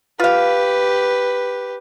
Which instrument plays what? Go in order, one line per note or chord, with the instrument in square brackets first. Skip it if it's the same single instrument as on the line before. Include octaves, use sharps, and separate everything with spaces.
[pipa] F4 F5 [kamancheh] G4 B4